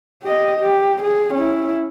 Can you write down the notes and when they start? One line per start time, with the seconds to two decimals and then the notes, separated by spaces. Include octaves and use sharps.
0.23 G4 D#5
0.60 G4
1.03 G#4
1.34 C#4 E4